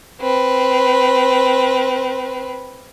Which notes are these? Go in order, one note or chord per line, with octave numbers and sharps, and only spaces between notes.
C4 B4